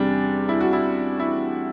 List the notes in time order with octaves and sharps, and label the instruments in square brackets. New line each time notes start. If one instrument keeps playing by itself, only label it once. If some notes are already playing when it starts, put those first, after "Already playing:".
Already playing: [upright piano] E2 C3 G3 D4
E4
F#4
E4
E4